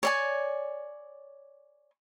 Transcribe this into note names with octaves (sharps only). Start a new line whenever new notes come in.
C#5 D5 G#5